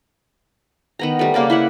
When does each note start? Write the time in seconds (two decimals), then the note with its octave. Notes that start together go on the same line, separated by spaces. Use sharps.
0.99 D#3 B3 A#5
1.19 G3 A3
1.34 C#3 A#3 A#4 D5
1.50 E4 E5 F#5